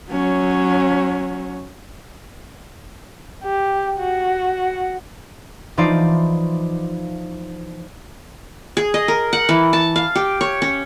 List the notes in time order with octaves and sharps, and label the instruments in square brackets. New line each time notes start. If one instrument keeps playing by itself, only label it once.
[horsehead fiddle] F#3 C#4
[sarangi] G4
F#4
[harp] E3 F3 D#4 F4 C5 D5
[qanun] G#4
D#5
A#4
F#5
E3
A5
F5
G4
C#5
C#4